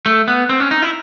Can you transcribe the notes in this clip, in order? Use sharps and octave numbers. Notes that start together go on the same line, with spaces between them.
A3
B3
C4
C#4
D#4
E4